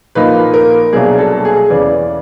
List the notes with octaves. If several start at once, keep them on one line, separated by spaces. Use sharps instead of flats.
A#2 F3 A#3 D#4 B4
A#4
C2 B2 F#3 A#3 D4 G#4
A4
G#4
E2 C#3 E3 D5